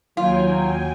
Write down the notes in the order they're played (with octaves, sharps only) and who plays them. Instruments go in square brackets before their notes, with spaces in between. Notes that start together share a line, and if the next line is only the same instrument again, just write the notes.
[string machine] D#2 G5 G#5 [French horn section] F#3 [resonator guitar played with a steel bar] F4